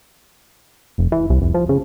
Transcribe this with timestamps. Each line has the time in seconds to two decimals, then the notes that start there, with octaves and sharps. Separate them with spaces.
0.98 F1
1.12 E3
1.30 C2
1.42 F1
1.54 F3
1.69 C#3